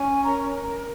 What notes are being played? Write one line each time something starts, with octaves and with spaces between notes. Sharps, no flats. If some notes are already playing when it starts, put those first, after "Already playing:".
Already playing: C#4 G#5
A#4 A#5